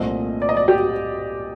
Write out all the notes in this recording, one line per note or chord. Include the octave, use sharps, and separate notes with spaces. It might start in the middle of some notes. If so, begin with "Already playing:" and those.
Already playing: C2 A#2 A3 C4 D#5
D5
D#5
D5
G4